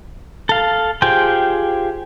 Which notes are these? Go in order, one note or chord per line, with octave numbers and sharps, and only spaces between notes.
A4 F5
F4 G4 G#4 C5 G5